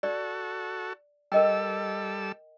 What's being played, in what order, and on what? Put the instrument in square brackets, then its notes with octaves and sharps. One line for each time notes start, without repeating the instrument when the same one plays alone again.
[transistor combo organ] F#4 A4 [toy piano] D5
[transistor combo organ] G3 A4 E6 [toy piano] A#4 D#5 G5